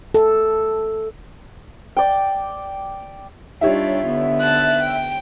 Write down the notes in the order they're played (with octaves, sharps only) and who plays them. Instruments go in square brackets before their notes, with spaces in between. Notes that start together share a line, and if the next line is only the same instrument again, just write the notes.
[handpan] A4
[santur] D5 G5
[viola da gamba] G3 D4 F4 [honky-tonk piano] D#4 G4 C#5 [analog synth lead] E5
[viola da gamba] D3 B3
[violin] A5 F#6
G5